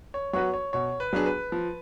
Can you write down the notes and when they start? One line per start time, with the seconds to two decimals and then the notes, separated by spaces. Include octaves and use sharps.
0.14 C#5
0.33 F#3 B3 F#4 B4 C#5
0.54 C#5
0.73 B2 C#5
1.00 B4
1.13 F#3 B3 D4 G#4
1.26 B4
1.52 F3